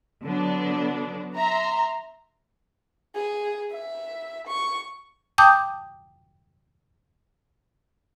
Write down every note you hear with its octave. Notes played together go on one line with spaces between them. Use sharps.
D3 F#3 B3 D4
E5 A#5 C6
G#4
E5
C#6
G5 A5 D6 D#6 G6